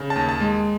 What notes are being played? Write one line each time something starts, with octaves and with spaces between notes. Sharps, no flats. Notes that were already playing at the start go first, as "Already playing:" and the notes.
Already playing: C#3
A5
D#2
A5
G#3